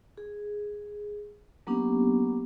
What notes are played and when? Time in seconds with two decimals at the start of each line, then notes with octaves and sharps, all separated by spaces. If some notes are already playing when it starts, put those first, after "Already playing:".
0.17 G#4
1.67 F#3 A#3 B3 C#4 D4 G4